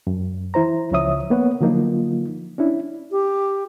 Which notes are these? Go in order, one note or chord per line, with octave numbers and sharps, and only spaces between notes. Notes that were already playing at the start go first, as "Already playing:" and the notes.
F#2
E3 E4 C5 A#5
C#2 C#3 F3 C#5 E5 D#6
A#3 B3 C#5 F#5
D3 F3 F#3 A#3 D#4 F4
C#4 D4 E4
G4